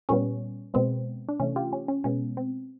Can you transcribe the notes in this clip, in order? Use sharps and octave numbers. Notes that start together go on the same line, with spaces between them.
A#2 G3 B3 C#4
B2 G#3 B3 C4
D4
C3 E3 A3 C#4
F4 G4
C#4
C#4
B2 G#3 B3 C#4
C4